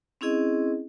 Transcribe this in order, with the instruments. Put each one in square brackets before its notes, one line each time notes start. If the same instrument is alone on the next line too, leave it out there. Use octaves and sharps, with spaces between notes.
[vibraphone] C4 C#4 E4 G#4 D#5